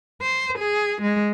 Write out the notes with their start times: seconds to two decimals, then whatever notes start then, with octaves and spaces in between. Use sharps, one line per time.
0.21 C5
0.59 G#4
1.02 G#3